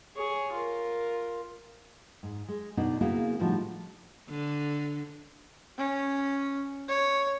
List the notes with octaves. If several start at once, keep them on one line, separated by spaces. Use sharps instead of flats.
G#4 C#5
F4 A#4
G#2
G#3
B2 D3 B3 D4 D#4
C#3 A#3 B3 E4 F#4 G#4
A2 D3 F3 G3 D#4 F#4
D3
C#4
C#5